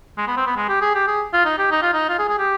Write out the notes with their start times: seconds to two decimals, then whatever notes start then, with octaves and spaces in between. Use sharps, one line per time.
0.18 G#3
0.28 B3
0.37 C4
0.47 B3
0.56 G#3
0.69 G4
0.82 G#4
0.95 G4
1.08 G#4
1.33 F4
1.45 D#4
1.59 G4
1.71 D#4
1.82 F4
1.93 D#4
2.09 F4
2.19 G#4
2.29 G#4
2.38 G4